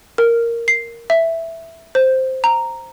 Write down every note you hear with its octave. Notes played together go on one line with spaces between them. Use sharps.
A#4
C7
E5
C5
A#5